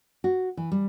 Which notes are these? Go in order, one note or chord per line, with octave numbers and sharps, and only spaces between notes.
F#4
E3
G3